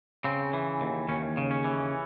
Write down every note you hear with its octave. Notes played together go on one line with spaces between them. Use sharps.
C#3 C4
E3
D#2
D#2 C#4
C#3
C#4
E3